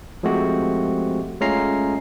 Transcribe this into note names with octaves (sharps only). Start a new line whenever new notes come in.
F3 G#3 A3 C4 F#4 G4
G#3 A3 C#4 F4 A#5 C7